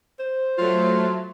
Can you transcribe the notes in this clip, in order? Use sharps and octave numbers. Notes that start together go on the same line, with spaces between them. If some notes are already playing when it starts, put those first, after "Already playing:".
C5
F#3 A3 F4